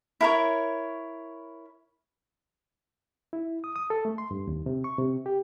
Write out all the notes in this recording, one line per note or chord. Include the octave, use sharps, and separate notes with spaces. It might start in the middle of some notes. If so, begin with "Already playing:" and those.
E4 A#4 C#5
E4
D#6
D#6
A4
A3
C6
G2
D#2
C3
C#6
C3
G4